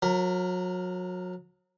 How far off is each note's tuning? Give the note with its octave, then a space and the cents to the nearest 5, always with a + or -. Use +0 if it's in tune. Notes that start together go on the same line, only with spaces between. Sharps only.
F#3 -30 A#4 +0